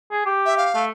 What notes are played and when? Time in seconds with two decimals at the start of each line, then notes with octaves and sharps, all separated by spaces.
0.11 G#4
0.26 G4
0.46 E5
0.58 F5
0.75 A3